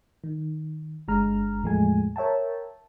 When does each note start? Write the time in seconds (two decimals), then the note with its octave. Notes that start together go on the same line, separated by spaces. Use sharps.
0.24 D#3
1.08 G1 D3 G#3 A#5 F6
1.63 E2 A2 F3 G#3 A3 G#5
2.16 A#4 C#5 E5 G5 A5